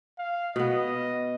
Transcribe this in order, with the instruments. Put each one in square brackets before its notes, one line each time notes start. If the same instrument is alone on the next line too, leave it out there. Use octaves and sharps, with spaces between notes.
[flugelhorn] F5
[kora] B2 B3 [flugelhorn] D#5